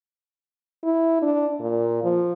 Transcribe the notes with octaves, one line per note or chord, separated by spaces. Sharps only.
E4
D4
A#2
F3